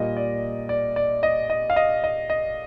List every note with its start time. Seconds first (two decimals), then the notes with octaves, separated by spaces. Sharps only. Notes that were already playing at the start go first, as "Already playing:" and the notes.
Already playing: A#2 G3 A#3 D#5
0.17 D5
0.69 D5
0.96 D5
1.23 D#5
1.50 D#5
1.70 F5
1.76 D#5
2.04 D#5
2.30 D#5